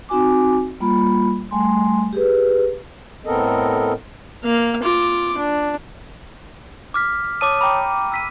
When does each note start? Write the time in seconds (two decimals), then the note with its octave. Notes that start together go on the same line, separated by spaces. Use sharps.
0.09 C4 D#4 F#4 G#5 D6
0.80 G3 A#3 F4 B5
1.51 G3 A3 G#5 C6
2.13 G4 G#4 B4
3.25 A2 B3 C4 A4 A#4 D#5
4.44 A#3 F5
4.83 F4 D6
5.37 D4
6.94 D6 F6 B6
7.41 C#5 A5 D6 D#6 D#7
7.61 G5 A#5 B5 D6
8.12 E6 B6 D#7